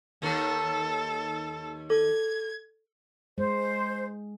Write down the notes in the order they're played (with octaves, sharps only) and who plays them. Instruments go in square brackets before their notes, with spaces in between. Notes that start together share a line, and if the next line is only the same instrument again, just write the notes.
[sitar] D#2 D#3 [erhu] A4
[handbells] A4 [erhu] G#6
[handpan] G#3 [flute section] C5